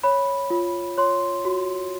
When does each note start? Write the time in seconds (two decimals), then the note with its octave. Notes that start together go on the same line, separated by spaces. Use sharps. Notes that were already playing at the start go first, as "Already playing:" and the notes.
0.03 C#5 B5
0.50 F4
0.98 C#5 C6
1.45 F#4